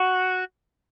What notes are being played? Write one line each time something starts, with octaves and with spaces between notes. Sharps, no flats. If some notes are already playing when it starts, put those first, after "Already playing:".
Already playing: F#4